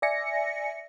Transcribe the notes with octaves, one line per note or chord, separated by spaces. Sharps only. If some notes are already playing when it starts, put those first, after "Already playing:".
D5 E5 G#5 A#6 C#7